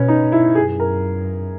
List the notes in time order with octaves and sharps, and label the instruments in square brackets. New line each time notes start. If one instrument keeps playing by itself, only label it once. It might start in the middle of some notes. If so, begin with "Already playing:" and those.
Already playing: [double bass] B2 [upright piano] C#4 B4
[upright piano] D#4
E4
[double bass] F#2 [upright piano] G#4
[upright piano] A#4